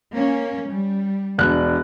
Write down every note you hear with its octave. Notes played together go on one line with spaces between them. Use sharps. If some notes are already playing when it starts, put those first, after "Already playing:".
A#3 C#4
G3
E1 D4 F#6